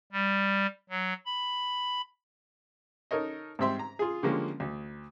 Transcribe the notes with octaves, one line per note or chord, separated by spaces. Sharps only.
G3
F#3
B5
D#4 A4 A#4 C#5 D#5
G#2 G3 C4 E5 C6
A#5
F4 G#4
D3 F3 G3 G#3 A#3 C#4
D2